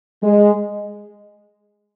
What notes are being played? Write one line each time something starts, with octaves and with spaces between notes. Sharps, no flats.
G#3